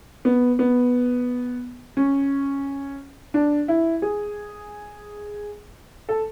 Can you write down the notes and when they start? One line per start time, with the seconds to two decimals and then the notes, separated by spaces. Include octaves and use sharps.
0.25 B3
0.59 B3
1.97 C#4
3.34 D4
3.68 E4
4.02 G#4
6.09 A4